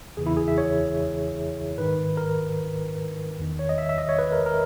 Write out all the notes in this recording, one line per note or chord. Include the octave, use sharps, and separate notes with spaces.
E2 C#3 E3 G#4
E4
G#4
E5
C#5
G#2 D#3 B4
A#4
E2 D#3
C#5
D#5
E5
E5
D#5
C#5
B4
A#4
A#4